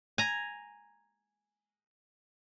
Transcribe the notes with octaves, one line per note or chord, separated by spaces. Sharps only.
G#5 A#5